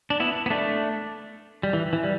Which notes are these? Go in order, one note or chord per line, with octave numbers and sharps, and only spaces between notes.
D4
B3 E4
B3
A3 D4
G3
E3
E3
G3